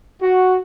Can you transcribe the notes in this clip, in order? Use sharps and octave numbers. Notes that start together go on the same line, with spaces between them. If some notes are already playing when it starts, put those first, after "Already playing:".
F#4